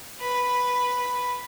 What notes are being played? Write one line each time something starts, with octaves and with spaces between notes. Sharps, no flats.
B4 B5